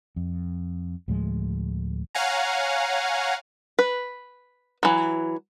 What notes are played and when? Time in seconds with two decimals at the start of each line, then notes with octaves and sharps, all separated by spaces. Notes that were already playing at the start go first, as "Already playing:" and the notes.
0.16 F2
1.08 D2 A2 F3 G#3
2.15 C#5 F5 F#5 G#5 A#5
3.79 B4
4.83 E3 F#3